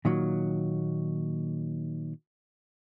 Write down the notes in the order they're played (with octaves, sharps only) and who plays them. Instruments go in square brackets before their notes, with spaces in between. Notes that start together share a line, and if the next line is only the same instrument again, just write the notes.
[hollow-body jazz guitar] A#2 D#3 F#3